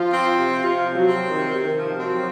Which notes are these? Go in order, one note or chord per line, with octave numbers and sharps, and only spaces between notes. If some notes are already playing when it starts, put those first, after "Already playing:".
Already playing: F3 F4
C4
C3
C3 F4
F3
F#3
C4
C3 D#3
C3
D#3
F3
F#3 C4